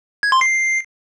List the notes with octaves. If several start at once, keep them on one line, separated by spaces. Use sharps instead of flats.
G#6
C6
C7